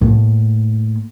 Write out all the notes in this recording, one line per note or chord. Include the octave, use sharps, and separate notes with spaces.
A2 A#3